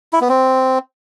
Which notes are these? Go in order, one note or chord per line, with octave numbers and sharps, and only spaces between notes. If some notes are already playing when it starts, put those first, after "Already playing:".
E4
B3
C4